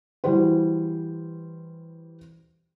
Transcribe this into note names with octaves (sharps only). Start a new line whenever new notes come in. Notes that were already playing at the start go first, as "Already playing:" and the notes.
E3 G3 F#4 C5